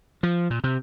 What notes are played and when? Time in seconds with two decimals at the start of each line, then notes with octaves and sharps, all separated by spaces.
0.23 F3
0.50 A#2
0.64 C3